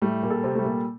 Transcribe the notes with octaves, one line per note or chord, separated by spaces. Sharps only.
A2 G3 A3
A#2 A#3
A4
C3 C4
G3 A3
A#2 A#3